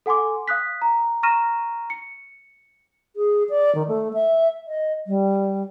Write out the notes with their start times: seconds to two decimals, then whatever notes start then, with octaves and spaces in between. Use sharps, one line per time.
0.06 A4 F#5 G#5 C6 D6
0.48 F5 D#6 F#6 B6
0.82 A#5
1.23 A#5 C#6 F6 A#6 D#7 E7
1.90 C#7
3.16 G#4
3.50 D5
3.75 D#3
3.88 A3
4.14 E5
4.67 D#5
5.07 G3